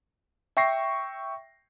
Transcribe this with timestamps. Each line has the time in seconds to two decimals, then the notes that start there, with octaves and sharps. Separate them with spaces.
0.57 E5 G5 C#6 A#6 C7